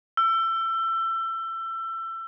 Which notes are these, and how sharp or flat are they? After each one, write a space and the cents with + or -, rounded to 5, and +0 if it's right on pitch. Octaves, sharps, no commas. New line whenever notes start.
E6 +25